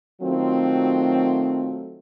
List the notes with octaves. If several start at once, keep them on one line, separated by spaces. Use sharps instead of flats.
D#3 F#3 A3 C4 F4 F#4